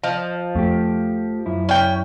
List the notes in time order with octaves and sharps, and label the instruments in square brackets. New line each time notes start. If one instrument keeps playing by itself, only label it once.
[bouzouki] F3 [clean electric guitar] D#5
[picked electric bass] F2 [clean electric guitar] A3 G4
[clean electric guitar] F#2 E4
[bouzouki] C#4 G5